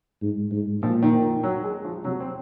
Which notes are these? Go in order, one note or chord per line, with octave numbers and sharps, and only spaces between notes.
G#2
G#2
A#2 F3
D#3
D#3
F#3
G#3
F3
C3 F#3
C4